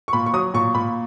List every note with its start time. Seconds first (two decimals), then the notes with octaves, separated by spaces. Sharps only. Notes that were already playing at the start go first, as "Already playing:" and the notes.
0.08 C#6
0.13 A#2 B5
0.26 C#6
0.33 F#3 D#6
0.54 A#2 C#6
0.75 A#2 B5